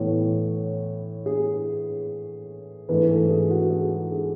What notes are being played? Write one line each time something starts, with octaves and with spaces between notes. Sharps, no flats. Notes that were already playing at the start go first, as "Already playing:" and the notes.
Already playing: A2 E3 B3 C#5
G#4
G#2 E3 A3 B4
A4
G#4
F#4
G#4
G#4